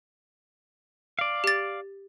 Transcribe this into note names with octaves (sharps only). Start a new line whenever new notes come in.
D5 F5
G4 A6